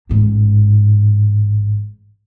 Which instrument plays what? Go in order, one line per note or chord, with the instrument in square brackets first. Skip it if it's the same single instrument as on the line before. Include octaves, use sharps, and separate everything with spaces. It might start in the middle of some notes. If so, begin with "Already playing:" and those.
[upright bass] A1 G#2